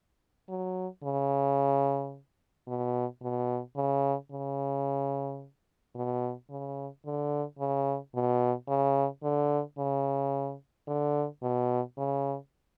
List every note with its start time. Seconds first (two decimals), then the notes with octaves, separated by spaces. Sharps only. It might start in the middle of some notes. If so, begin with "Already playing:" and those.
0.49 F#3
1.04 C#3
2.67 B2
3.22 B2
3.76 C#3
4.31 C#3
5.95 B2
6.50 C#3
7.05 D3
7.59 C#3
8.15 B2
8.68 C#3
9.23 D3
9.78 C#3
10.87 D3
11.43 B2
11.97 C#3